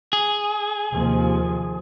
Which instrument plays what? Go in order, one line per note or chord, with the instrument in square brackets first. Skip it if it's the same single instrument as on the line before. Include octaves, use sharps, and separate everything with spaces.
[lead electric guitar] G#4
[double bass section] D#2 C3 F3